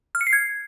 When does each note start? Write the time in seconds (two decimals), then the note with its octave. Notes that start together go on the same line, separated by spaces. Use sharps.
0.15 F6
0.21 C#7
0.27 C7
0.33 G#6